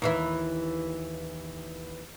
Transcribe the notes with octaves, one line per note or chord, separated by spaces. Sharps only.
D#2 E3 E4